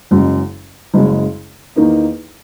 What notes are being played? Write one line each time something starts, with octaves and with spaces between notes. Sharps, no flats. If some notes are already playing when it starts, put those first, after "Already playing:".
F#1 F#2 C#3 G#3
F#1 F#2 C#3 G#3
E2 D#3 A#3 D#4